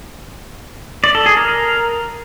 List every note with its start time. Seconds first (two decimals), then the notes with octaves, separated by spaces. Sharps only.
1.04 D5
1.15 A4
1.26 G#4
1.37 A#4